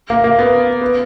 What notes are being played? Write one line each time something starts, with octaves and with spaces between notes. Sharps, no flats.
A#3
A#3
B3
B3